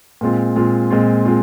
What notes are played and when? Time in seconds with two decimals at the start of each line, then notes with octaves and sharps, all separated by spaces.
0.21 A#2 G#3 C4 F4
0.56 A#2 G#3 C4 F4
0.91 A#2 G#3 C4 F4
1.25 G#3 C4 F4